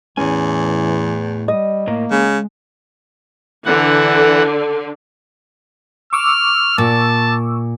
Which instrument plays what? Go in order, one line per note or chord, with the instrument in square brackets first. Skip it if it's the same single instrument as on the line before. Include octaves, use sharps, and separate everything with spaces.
[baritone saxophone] E2 [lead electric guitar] A2 G#5 [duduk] E3 [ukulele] C#4
[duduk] G3 [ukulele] D#5
[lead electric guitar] A2 A#4 [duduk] A#3
[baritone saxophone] C#3 [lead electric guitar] G#3
[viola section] D3 [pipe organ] E3 F#5
[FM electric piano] C#6 D6 E6 [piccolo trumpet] F6
[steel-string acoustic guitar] A#2 [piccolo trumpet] A5